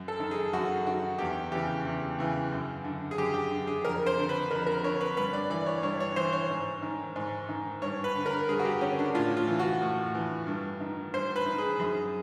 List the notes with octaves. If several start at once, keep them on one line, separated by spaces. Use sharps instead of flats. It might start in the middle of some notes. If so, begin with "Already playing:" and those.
Already playing: F#2
A4
D#3
G#4
F#2 F#4
D#3 F#4
E2 G4
C#3 E3 G4
E2
C#3 E3
F#2
D3
G#4
F#2 G4
G4
D3
G#4
F2 A#4
C5
D3
B4
F2 A#4
A#4
D3 C#5
B4
G2 B4
D5
E3 D5
C#5
G2 C#5
C#5
E3 C5
C#5
G#2
D#3
G#2
D#3
G2 C#5
B4
D3
A#4
G2 G#4
F#4
G4
D3 C#4
D4
A2 F4
F4
E3
F#4
A2
E3
G2
D#3
G2 C5
B4
D#3
G#4
F#2 G#4